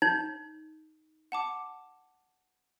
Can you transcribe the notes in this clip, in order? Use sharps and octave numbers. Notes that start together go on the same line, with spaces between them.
D#4 G6
F#5 A5 D6